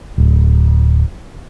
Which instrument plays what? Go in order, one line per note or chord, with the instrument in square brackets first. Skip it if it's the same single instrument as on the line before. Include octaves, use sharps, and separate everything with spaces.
[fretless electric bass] D1